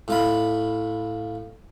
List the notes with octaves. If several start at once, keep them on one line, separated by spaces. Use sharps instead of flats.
A2 F4 B5